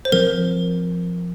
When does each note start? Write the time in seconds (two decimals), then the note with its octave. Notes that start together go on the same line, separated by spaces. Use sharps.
0.05 C5
0.12 F3 C4 A#4